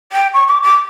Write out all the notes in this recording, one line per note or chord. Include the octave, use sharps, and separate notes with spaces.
G5
C#6
D6
D6